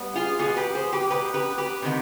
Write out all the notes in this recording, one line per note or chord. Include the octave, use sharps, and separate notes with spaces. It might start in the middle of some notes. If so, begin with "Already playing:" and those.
Already playing: G3 B3
F4 G#4
B2 B3 F4 G#4
G4 B4
G#4 C5
G4 B4
B2 B3 G4 B4
G4 B4
G4 B4
C3 D#3 B3